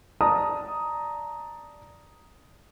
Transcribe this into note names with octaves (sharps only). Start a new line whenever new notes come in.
D5 A5 A#5 D#6